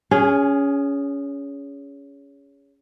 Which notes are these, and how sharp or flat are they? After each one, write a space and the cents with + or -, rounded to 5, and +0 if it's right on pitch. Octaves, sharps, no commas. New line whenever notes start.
C#4 +20 G#4 -10